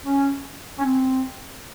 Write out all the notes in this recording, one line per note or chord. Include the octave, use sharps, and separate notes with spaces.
C#4
C#4
C4